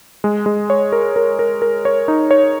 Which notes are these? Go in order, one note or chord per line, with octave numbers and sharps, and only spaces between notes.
G#3
G#3
C#5
A#4
A#4
A#4
A#4
C#5
D#4
C#5